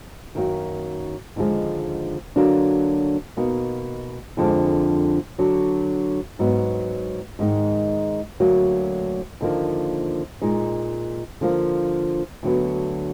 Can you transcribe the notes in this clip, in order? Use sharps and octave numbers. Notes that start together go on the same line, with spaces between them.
F#2 D#3 F#3 A#3
D#2 D3 F3 G#3
D3 F#3 A#3 D4
B2 A#3 D#4
F2 D3 F3 G#3 D4
D3 F#3 D4
G#2 F#3 B3
G#2 D#3 G#3 D#4
D2 D3 F#3 A#3
D#2 D3 F3 A#3
A#2 G#3 D#4
D3 F3 A#3
D2 D3 F#3 B3